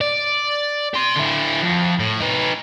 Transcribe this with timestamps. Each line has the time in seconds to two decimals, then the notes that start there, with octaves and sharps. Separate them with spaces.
0.01 D5
0.94 G4 C6
1.16 D3 E4
1.62 F2
2.00 A2
2.20 D#4 B4